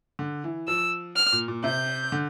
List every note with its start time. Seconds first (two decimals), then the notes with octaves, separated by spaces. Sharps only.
0.19 D3
0.44 E3
0.68 F3 E6
1.16 F6
1.32 A#2
1.48 A#2
1.64 C3 G6
2.12 D3